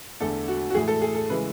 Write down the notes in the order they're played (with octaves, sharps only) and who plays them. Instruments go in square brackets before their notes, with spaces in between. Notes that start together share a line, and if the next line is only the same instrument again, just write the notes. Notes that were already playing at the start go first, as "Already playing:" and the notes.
[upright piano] E2 D3 A3 A4
F#4
F#4
A2 E3 A3 G#4
A4
G#4
A4
C#3 E3 G#3 B4